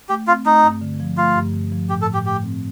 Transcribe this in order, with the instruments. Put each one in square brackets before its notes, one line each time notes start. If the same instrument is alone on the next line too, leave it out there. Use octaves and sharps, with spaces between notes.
[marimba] A3 [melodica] G4
[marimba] C4 [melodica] F4
[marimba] A3 [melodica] D#4
[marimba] G2
D3
F3
[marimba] A3 [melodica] F4
[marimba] G2
D3
F3
[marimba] A2 [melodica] G4
[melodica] A4
[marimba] A2
[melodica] G4
[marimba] A3 [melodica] G4
[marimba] C4